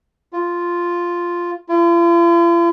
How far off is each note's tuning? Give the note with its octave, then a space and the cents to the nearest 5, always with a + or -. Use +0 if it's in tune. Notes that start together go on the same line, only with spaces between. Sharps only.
F4 -5
F4 -45